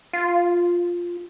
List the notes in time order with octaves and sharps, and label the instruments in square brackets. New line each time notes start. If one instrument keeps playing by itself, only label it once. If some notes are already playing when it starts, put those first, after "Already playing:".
[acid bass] F4